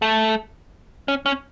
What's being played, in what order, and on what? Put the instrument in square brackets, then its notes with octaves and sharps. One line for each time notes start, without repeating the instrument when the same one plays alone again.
[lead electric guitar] A3
C#4
C#4